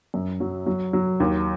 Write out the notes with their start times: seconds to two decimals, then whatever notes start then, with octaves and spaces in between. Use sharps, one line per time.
0.14 F#2
0.40 F#3
0.66 F#3
0.93 F#3
1.20 D#2